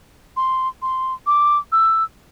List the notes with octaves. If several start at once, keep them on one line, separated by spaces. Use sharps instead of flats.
C6
C6
D6
E6